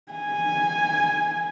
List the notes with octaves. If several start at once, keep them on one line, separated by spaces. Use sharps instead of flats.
G#5